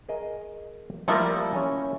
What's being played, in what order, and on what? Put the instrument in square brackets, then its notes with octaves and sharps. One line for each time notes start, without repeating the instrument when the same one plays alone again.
[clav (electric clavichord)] G#4 A#4 D#5
[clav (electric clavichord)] F3 G3 A#4 [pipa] A3 A#3 E4
[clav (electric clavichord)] C#4 C#5 G#5